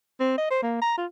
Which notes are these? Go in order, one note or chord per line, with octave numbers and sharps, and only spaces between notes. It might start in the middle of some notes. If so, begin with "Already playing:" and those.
C4
D#5
C5
A#3
A#5
F4